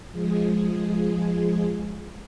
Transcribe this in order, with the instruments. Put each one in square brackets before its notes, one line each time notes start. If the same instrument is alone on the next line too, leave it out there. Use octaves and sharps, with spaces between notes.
[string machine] F3 G#3 G#4